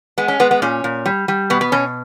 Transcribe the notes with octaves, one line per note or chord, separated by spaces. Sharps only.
G#3 B3
C#4
G#3 B3
B3
A#2 C#4
A#2
G3
G3
B2 B3
B3
B2 C#4